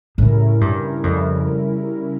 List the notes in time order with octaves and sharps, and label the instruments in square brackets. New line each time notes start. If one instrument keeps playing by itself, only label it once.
[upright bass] A2 [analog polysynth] C#3 G3 C#4 E4 A#4
[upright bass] G2
[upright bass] F2 [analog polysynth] C#3 G3 C#4 E4 A#4